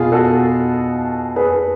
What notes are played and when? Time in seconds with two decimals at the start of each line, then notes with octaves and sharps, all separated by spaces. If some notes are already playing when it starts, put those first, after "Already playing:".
Already playing: B2 F4 G#4
0.12 F#4 A4
1.36 G#4 B4